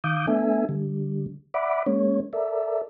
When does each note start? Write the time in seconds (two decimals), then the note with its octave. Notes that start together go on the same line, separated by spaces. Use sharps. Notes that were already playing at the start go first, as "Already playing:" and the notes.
0.04 D#3 F5 D6 D#6 G6
0.27 A3 B3 D4 A4 E5 G#5
0.69 D3 G3
1.54 D5 E5 F#5 B5 D6
1.86 G#3 A#3 C#4 C#5
2.33 A4 A#4 D5 E5